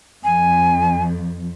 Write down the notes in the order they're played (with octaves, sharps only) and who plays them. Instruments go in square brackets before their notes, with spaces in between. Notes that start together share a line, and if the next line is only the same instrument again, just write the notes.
[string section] F2 [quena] G#5